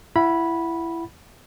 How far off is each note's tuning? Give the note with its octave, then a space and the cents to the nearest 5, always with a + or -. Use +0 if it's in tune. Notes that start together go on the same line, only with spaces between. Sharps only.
E4 +20 F#5 +0 B5 -10